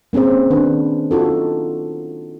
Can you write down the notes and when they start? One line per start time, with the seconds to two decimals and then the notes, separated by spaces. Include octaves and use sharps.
0.13 A#3 C4 C#4 G#4 C5
0.50 D#3 D4 B4
1.11 D#4 F4 F#4 A4